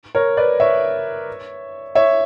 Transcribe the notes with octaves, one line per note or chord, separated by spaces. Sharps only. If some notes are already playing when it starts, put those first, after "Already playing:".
A#4 C#5
B4 D5
C#5 E5
C#5 E5